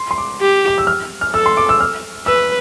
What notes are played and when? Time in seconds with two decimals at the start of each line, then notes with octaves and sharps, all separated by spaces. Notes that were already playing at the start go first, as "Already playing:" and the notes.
Already playing: C6
0.11 C6
0.18 D6
0.41 G4
0.67 D6
0.78 E6
0.87 F6
1.21 F6
1.34 A4 E6
1.46 C6
1.57 D6
1.69 E6
1.80 F6
2.26 B4 E6